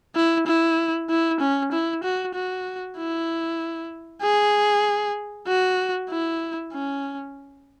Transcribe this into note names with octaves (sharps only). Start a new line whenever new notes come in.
E4
E4
E4
C#4
E4
F#4
F#4
E4
G#4
F#4
E4
C#4